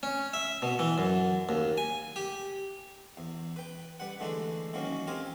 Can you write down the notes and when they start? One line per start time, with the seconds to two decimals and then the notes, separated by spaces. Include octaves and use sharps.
0.03 C#4
0.34 E5
0.62 B2
0.79 E3
0.98 F#2
1.49 D#2
1.78 G#5
2.16 G4
3.17 E2
3.56 B4 G5
4.00 G3 B4 F#5
4.20 D3 E3 G#3 A3 D4
4.74 D#3 E3 F#3 A#3 C#4
5.07 C4 F4 G4 A#4 G#5